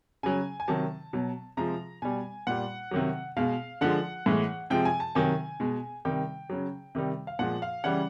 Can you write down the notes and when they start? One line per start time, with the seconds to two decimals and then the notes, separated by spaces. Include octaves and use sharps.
0.23 C#3 F#3 G#5
0.60 G#5
0.68 C3 D#3 F#3 A5
1.13 B2 F#3
1.57 C3 F3 G#3 A#5
2.02 B2 G3 G#5
2.47 A#2 G3 F#5
2.91 C3 D#3 F#3
3.37 B2 G#3 F5
3.81 D3 F3 G#3 F#5
4.26 A2 E3 G#3
4.70 C3 F3 G#3 G5
4.85 G#5
5.00 A5
5.15 C3 D#3 F#3 G#5
5.60 B2 G#3
6.05 C3 D#3 G3 G5
6.50 C#3 F#3
6.95 C3 D#3 G3
7.27 F5
7.39 A#2 F3 G#3 F#5
7.62 F5
7.84 C#3 E3 G3 F#5